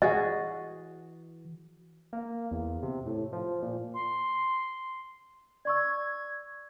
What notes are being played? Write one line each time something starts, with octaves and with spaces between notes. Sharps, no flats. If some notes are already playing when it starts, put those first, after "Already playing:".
E3 F#4 G#4 D#5
A#3
E2
C3
A2
F3
A#2
C6
D5 C#6 E6 G#6